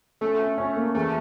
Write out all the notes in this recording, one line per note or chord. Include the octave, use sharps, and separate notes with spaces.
A3 C#4
C#4
C#4
A#3
E2 A3